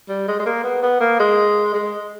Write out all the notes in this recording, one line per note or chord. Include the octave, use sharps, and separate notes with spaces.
G3
G#3
G#3
A#3
B3
B3
A#3
G#3
G#3